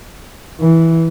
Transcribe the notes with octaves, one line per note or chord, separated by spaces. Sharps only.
E3